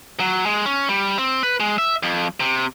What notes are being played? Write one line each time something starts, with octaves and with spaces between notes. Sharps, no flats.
F#3
G#3
C#4
G3
C4
B4
G#3
E5
F2
C3